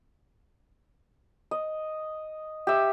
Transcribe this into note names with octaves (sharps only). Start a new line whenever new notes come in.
D#5
G4 E5